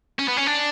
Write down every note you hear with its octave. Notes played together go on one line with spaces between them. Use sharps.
C#4
B3
C#4
D4